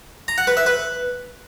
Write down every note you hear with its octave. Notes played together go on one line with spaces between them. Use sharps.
A#5
F#5
B4
E5
B4